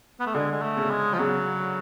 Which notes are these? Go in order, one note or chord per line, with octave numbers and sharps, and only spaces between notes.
B3
A3
D3 G#3
G#3
A3
C#3
G#3
F3
C#3 F#3